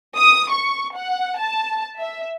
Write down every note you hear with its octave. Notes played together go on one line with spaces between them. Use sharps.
D#6
C#6
F#5
A5
E5